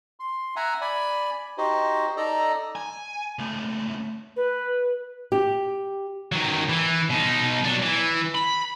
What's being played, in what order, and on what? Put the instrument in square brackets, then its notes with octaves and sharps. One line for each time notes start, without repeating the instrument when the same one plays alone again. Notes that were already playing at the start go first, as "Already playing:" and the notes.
[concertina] C6
E5 F#5 G#5 A#5
D5 G#5 B5
D#4 F#4 G4 C5 D#5
D#4 A4 D5 D#5 A#5
[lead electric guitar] G#5
C#2 A3
[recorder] B4
[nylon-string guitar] G4
[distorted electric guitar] D#3 F#3
E3
B2 D#4
F#3 D4
E3
B5